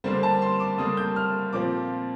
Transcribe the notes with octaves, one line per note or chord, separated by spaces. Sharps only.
D3 G3 A#3 D4 C5
A5
C6
D6
D3 G3 A#3 D4 D#6
G6
F6
A#2 F3 C4 F4 D6